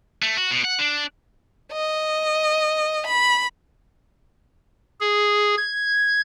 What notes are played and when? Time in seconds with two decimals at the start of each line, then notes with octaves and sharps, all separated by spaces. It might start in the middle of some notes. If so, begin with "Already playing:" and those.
0.22 A3
0.37 F#4
0.51 B2
0.65 F#5
0.79 D4
1.72 D#5
3.07 B5
5.01 G#4
5.57 G#6